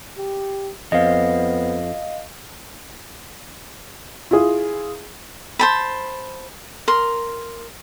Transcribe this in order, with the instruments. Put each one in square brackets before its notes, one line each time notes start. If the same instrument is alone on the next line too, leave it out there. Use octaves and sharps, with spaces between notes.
[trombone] G4
[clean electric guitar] F2 [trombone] B3 [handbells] D#5 F5
[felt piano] E4 F4 G#4
[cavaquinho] C5 A5 B5
A#4 C6